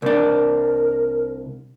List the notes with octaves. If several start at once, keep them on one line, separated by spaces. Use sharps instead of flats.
C2 D4 A#4